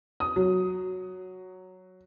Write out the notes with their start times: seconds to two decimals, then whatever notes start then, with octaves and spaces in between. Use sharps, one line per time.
0.20 D#6
0.36 F#3